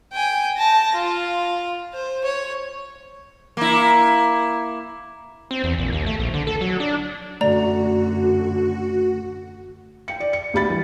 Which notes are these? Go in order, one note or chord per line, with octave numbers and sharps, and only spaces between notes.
G5 G#5
A5 A#6
F4
C5
C#5
A#3 E4
C4
E2
A#1
D#2
A3
A#1
D3
A4
F#3
D4
F#2 D3 A3 F#4 D5 A#5
G5 C#7
D5
C#7
D2 G4 B5 A6
E3 G3